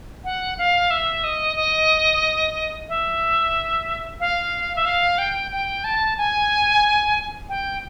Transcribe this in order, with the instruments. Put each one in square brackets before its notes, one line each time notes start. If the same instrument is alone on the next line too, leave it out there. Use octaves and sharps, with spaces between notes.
[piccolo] F#5
F5
E5
D#5
D#5
E5
F5
E5
F5
G5
G5
A5
G#5
G5